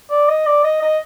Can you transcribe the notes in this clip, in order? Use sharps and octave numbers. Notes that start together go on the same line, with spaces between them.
D5
D#5
D5
D#5
D#5